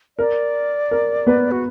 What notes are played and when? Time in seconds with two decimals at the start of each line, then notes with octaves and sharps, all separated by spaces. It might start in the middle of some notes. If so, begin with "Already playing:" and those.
0.18 A#4 D5
0.91 A#4
1.27 B3 B4
1.51 F#4